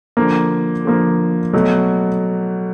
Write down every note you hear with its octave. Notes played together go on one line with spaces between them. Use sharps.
D3 F3 A#3
D3 F3 A#3
B2 F#3 A3